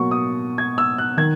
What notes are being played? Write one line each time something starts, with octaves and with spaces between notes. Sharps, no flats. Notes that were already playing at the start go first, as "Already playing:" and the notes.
Already playing: B2 F#3 A#3 C#6
D#6
G#6
E6
F#6
D#3 G#6